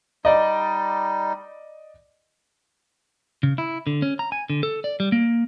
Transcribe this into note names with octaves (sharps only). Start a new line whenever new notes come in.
G3 D#4 D5 D#5
C#3
E4
D3
C#4
A#5
G#5
D3
A4
D5
G3
A#3